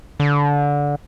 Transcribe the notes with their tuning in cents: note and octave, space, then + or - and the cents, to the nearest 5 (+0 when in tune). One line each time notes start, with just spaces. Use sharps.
D3 -20